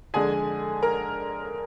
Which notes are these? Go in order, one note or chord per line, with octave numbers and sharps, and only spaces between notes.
F2 D3 G#3 D4 G#4 G#5
A#4 A#5